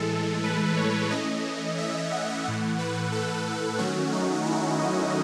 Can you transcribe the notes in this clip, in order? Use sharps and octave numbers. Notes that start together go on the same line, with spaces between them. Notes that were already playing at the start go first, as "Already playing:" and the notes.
Already playing: A2 E3 G#3 A4
B4
C#5
E3 A3 C#4 D#5
E5
F#5
A2 E3 A3 F#5
B4
A4
D#3 F#3 A3 C#4 F#4
D#4
E4
D#5